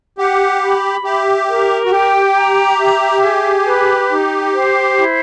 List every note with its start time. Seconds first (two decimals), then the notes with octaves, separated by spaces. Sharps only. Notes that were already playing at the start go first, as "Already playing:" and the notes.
0.18 G4 F#5
0.61 B5
1.04 G4 E5
1.48 A#4
1.85 F#4
1.91 G4 G5
2.35 A#5
2.79 E5
3.22 G#4
3.66 B4
4.09 D#4
4.53 C5
4.96 E4